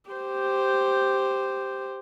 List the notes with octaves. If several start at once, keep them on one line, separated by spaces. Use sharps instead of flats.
G4 C5